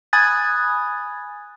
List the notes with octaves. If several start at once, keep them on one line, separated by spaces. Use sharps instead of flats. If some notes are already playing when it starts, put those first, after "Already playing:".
G#5 B5 D#6 F#6 G#6 A6